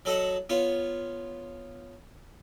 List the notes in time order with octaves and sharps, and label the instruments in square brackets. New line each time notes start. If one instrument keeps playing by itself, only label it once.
[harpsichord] F#3 A4 D#5 F#5 A5
B3 F4 C#5